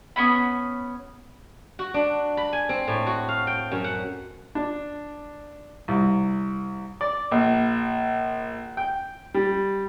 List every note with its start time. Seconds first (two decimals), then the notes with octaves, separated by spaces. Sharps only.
0.16 B3 C#4 B5
1.79 F#4
1.94 D4
2.37 B5
2.53 G#5
2.69 C4
2.88 A2
3.07 F#4
3.29 F5
3.47 G5
3.72 F#2
3.84 F#5
4.55 D4
5.88 C2
7.01 D5
7.31 A#1
8.77 G5
9.34 G3